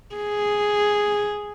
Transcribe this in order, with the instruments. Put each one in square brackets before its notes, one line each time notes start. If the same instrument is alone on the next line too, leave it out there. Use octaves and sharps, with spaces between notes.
[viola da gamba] G#4